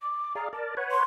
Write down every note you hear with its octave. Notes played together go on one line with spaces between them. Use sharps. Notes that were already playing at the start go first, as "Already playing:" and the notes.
D6
G#4 D5 F5 A#5
A#4 D5 A5
B4 C#5 F#5
C6